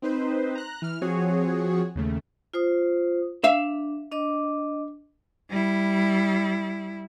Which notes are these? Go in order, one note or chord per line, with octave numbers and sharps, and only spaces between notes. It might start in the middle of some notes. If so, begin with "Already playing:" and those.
C4 D#4 B4 C5
A#5 F#6
E3 F6
F3 C4 F#4 G#4 C#5
D#2 C#3 A3
F4 C5 D#6
D4 E5 F5
D4 D#5 D6
G3 E4